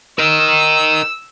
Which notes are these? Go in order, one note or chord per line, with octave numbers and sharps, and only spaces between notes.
A#4 D#5 E6